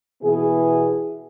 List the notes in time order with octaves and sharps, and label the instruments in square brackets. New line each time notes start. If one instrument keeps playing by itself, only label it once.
[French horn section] B2 E3 B3 E4 G#4